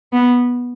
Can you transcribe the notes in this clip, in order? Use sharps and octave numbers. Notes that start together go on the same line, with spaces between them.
B3